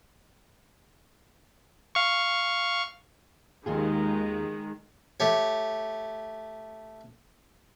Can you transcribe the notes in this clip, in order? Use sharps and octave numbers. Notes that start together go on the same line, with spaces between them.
F5 C#6
D#2 D#3 G#3 F4 G#4
A3 G4 C#5